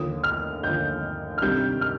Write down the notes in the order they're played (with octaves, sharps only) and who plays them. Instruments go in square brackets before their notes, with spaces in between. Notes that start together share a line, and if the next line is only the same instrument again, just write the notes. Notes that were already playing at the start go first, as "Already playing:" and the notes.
Already playing: [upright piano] D#2 D3 F3 [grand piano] D#6
[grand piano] F6
[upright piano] D#2 D3 F3 [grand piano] G6
[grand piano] F6
[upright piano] C3 D#3 G3 D4 G4 [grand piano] G6
[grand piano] F6